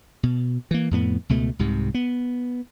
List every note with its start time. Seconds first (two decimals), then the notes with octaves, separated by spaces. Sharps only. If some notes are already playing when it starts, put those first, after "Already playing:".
0.23 B2
0.71 E3 A#3
0.91 F2 A2 B3
1.29 C#2 B2 A3
1.59 C2 G#2 C3
1.94 B3